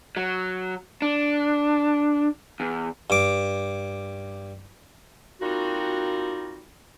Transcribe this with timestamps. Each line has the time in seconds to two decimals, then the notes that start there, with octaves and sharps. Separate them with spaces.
0.17 F#3
1.02 D4
2.60 E2
3.10 G2 D6
5.41 G3 A#3 C4 D#4 F4 F#4